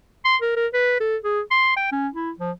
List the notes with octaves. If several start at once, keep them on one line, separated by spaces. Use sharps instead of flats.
C6
A#4
A#4
B4
A4
G#4
C6
G5
C#4
E4
F3